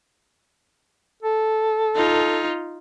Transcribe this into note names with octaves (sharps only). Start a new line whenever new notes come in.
A4
D#4 F4